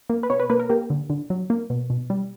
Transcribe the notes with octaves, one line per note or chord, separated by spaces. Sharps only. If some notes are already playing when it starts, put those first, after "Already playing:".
A#3
B4
B2 C#5
B4
A#3 B4
A#4
A#3 G4
D3
D3
F#3
A#3
B2
B2
G3